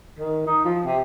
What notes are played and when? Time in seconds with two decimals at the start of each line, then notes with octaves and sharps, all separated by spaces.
0.19 D#3
0.46 D#4
0.65 F3
0.85 C3